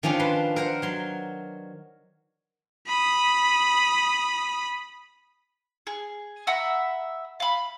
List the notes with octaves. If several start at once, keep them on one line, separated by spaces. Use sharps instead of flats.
D#3 F3 C#4 D4 F4
B4 A5 C6
A#4 C5 F#5
F#3 C6
B5 D#6
G#4
E5 F#5 A#5 B5
F5 B5